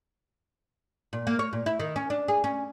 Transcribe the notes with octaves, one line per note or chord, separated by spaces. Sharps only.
A#2
A#3
C#5
A#2
E4
D#3
C#4
D4
G#4
C#4